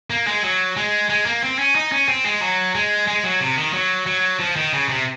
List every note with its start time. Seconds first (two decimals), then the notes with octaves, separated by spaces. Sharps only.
0.10 A#3
0.27 G#3
0.43 F#3
0.76 G#3
1.09 G#3
1.26 A#3
1.42 C4
1.59 C#4
1.75 D#4
1.92 C#4
2.09 C4
2.25 G#3
2.41 F#3
2.75 G#3
3.07 G#3
3.24 F#3
3.41 C3
3.58 D#3
3.73 F#3
4.06 F#3
4.40 F3
4.56 D#3
4.73 C#3
4.89 C3